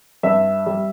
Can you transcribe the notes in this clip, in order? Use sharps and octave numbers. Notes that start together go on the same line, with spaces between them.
G2 E5
G3